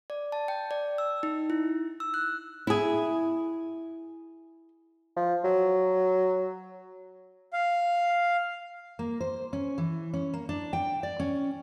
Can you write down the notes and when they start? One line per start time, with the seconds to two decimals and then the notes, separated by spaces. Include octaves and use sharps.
0.10 D5
0.32 A5
0.48 G5
0.71 D5
0.98 E6
1.23 D#4
1.50 E4
2.00 E6
2.14 F#6
2.67 E4 G#4
5.17 F3
5.44 F#3
7.53 F5
8.99 A#3
9.21 C5
9.53 C#4
9.78 E3
10.14 C#4
10.34 A#3
10.49 D4
10.73 G5
11.03 D5
11.20 C#4